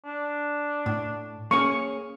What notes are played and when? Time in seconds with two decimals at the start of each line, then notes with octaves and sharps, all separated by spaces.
0.05 D4
0.86 A2
1.51 A#3 C#4 G#4 C#6